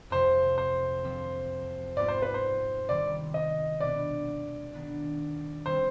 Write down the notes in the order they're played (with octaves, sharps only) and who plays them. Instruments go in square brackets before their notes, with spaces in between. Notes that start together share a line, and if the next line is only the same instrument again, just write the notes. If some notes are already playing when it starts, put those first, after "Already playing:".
[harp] F2 C3 F3 C4 G4 [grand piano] C5
[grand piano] C5
[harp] F3 C4 G4
[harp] G#2 G3 B3 F4 [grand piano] D5
[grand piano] C5
B4
C5
[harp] C3 D#3 G3 C4 [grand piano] D5
[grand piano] D#5
[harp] B2 B3 D4 [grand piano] D5
[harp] D#3 B3 D4
[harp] D#3 G3 C4 [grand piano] C5